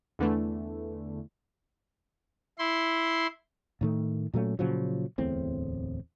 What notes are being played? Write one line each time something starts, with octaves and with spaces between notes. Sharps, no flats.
E2 D3 E3 A3
E4 C6
A2 D#3 A3
A#2 F#3 A3 C#4
A#2 C#3 F3 F#3
D1 E2 A2 C4